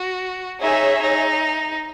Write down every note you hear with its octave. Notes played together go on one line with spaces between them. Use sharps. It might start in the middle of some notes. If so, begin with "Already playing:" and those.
Already playing: F#4
D#4 G#4 C#5 E5
D#4